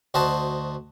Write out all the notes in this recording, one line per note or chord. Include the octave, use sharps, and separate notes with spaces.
D2 F#4 C5 D#5 A5